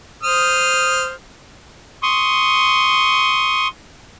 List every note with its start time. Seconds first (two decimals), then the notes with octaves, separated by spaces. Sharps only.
0.23 C5 D#6 F6
2.03 C6 C#6 D#6